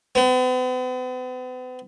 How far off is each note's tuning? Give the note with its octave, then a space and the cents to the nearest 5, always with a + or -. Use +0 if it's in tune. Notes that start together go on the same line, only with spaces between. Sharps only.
B3 +45